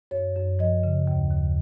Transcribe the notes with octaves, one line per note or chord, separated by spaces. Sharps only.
F#2 C#5
F#2
F3 D#5
C#3
D#2
D#2